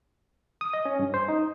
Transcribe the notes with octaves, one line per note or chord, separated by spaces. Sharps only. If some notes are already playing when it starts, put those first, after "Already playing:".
D#6
D#5
C#4
G2
C5
D#4